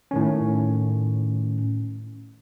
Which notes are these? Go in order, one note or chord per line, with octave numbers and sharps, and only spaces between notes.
A2 D#3 C#4